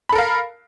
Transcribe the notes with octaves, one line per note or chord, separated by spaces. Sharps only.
A4 A#4 F5 B5